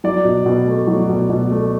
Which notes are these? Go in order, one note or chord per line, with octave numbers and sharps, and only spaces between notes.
F#3 D5
B2
B2
A3
F#3
B2
B2
A3